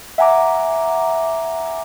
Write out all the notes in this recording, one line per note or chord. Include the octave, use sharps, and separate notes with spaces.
E5 F#5 G#5 A#5 D6